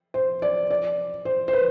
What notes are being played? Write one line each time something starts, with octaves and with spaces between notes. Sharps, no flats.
C5
D5
D5
C5
C5
B4